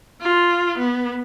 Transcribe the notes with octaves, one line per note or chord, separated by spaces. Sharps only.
F4
B3